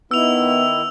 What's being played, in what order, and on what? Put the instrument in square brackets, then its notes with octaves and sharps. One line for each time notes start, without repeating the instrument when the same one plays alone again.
[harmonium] D#3 E4 [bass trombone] B3 [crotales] E6 F7